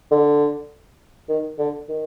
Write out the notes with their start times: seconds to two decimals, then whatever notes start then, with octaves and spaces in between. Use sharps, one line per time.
0.11 D3
1.29 D#3
1.59 D3
1.89 D#3